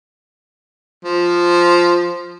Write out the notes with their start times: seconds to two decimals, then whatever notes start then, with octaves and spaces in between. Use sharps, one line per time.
1.05 F3